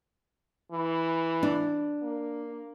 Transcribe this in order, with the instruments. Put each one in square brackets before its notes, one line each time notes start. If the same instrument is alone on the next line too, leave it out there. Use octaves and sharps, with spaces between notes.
[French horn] E3
[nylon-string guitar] D4
[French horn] A#3